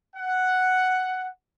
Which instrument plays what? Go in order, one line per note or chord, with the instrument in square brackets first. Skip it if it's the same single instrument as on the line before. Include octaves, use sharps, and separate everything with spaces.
[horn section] F#5